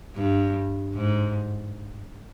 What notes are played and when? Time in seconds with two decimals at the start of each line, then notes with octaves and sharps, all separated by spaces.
0.15 G2
0.93 G#2